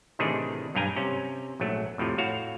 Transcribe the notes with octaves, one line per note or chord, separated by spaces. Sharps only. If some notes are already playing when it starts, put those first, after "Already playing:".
A2 C3 D#3 E3 D4 G#4
B1 G2 F5 G5 G#5 A#5
C3 C#4
A#1 G#2 F#3 A3
F2 A2 C3 F3
A2 F#4 C#5 F5